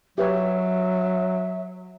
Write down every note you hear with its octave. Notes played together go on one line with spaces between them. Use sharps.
F#3 G4 B4 C#5 E5